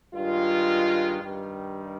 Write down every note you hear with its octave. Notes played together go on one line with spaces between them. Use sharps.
G2 D#3 G#3 F4
G2 D#3 G3